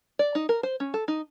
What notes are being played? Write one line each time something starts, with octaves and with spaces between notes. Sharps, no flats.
D5
D#4
A#4
C5
C#4
A4
D#4